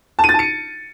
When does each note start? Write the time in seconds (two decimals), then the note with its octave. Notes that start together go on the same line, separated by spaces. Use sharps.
0.19 A5
0.24 D#7
0.29 A6
0.34 A5
0.39 C#7